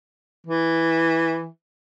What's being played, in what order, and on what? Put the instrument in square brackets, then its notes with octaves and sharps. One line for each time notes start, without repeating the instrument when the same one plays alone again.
[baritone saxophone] E3